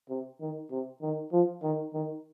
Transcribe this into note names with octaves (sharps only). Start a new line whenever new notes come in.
C3
D#3
C3
D#3
F3
D#3
D#3